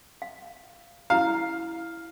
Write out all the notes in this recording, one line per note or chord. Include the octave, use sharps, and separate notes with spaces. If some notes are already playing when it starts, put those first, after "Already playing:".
F5
E4 F5 A#5